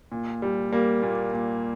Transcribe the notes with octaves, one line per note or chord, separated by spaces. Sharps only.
A#2
G3
G3 A#3
A#2
A#2